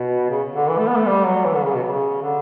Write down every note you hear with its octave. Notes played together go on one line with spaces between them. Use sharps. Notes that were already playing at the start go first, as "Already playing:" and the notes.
Already playing: B2
C#3
D3
E3
A3
B3
A3
G3
F#3
E3
D3
C#3
B2
C#3
D3